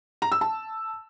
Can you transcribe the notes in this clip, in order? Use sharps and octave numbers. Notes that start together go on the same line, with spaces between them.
A#5
E6
A5